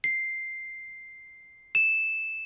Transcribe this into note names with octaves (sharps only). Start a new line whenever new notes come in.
C7
E7